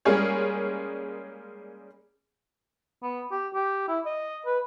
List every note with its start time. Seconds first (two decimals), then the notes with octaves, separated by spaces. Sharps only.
0.05 G3 G#3 A#3 C#4 G#4 C#5
3.03 B3
3.31 G4
3.54 G4
3.88 E4
4.06 D#5
4.46 B4